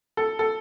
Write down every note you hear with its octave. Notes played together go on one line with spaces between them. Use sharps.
A4
A4